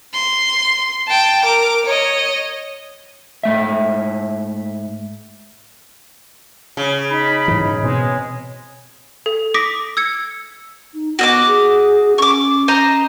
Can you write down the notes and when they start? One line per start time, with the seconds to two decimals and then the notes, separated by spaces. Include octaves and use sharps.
0.14 C6
1.08 G5 A5
1.44 A#4 D6
1.85 C#5 D#5
3.43 G#2 A3 E5
6.77 C#3
7.10 D#4 B5
7.48 G#2 E3
7.83 B2 G#3 C4
9.26 A4
9.54 D6 D#6 A#6 B6 D7
9.97 E6 G#6 C#7
10.94 D#4
11.19 B3 F#4 D#5 D6
11.47 G#4
12.18 C#4 C#6 D6
12.68 C5 D#5 A#5